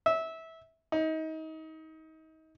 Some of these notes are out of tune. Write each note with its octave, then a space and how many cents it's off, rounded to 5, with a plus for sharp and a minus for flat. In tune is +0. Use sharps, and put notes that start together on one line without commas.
E5 -20
D#4 +30